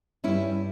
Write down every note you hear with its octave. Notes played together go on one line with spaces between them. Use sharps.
G2 G3 C#4 E4